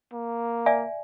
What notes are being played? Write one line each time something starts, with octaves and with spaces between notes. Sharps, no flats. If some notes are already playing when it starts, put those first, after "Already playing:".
A#3
D5 E5 G#5